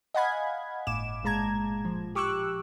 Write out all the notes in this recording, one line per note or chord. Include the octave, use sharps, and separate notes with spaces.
D#5 F5 F#5 G#5 B5 G#6
G1 A2 D6 E7
G1 A#2 G#3 A5 A#5 G#6
F3
G4 C#6 D6 E6 F#6